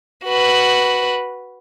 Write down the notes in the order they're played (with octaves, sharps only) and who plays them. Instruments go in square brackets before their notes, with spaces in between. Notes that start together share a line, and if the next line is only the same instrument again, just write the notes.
[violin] F#4 B4